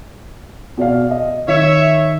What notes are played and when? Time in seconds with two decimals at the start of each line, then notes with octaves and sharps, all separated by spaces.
0.78 B2 D5 F5
1.11 D#5
1.48 D#3 C#5 E5